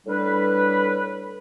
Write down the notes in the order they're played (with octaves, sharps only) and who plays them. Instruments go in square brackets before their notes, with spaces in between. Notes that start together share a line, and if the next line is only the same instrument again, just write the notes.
[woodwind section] A2 G3 D4 B4